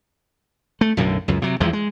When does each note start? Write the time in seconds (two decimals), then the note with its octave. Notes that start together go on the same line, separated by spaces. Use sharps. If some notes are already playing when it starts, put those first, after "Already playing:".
0.81 A3
0.97 B1 F#2 A2 D3
1.28 C#2 F#2
1.42 C3 F#3
1.60 E2 E3 F3 G#3
1.73 G#3